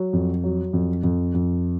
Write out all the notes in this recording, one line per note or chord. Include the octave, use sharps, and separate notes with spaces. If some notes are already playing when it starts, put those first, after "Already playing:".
Already playing: F#3
F2
F#3
F2
F2
F2